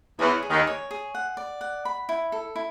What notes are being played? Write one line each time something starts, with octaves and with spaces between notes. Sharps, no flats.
E2 E3 C#5
G#4
D#2 D#3
C#5
G#4
F#5
D5
F#5
B5
E4
A4
E4